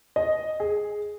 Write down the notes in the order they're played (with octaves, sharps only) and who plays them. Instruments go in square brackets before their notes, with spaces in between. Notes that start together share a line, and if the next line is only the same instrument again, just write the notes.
[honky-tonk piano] D#5
G#4